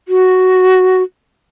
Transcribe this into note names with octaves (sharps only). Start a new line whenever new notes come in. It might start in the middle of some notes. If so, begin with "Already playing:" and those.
F#4